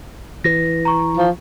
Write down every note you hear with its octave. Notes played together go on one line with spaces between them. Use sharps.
E3 A#6
A#5 C#6
F3